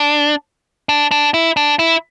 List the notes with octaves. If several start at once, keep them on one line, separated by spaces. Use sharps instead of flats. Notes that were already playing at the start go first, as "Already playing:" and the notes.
Already playing: D4
D4
D4
E4
D4
E4